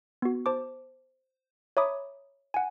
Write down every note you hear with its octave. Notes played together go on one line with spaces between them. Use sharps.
B3 F#4
C5 A5 D6
C#5 E5 A#5 B5 D6 D#6
F#5 G#5